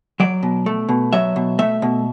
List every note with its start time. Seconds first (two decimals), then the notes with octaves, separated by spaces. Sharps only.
0.20 F#3 D5
0.43 B2
0.66 A3
0.89 B2
1.13 F#3 E5
1.36 B2
1.59 A3 E5
1.82 B2